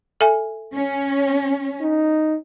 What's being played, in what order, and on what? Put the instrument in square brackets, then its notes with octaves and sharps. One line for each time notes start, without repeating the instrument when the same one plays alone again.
[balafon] A4 E5 G#5
[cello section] C#4
[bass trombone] D#4